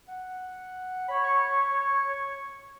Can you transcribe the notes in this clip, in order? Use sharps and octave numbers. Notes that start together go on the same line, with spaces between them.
F#5
C#5 B5
C#6